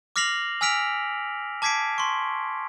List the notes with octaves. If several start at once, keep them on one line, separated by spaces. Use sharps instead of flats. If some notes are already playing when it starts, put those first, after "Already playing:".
D6 F6 A#6 C7 F7 F#7
G#5 E6 F6 B6 D7 F7
A5 D6 G#6 B6 C7 D7
C6 C#6